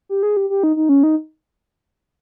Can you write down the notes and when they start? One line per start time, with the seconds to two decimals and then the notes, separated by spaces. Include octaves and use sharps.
0.09 G4
0.23 G#4
0.37 G4
0.50 G4
0.63 D#4
0.76 D#4
0.89 C#4
1.03 D#4